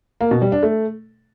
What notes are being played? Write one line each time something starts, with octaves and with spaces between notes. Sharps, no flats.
A#3
B2
G3
D4
A3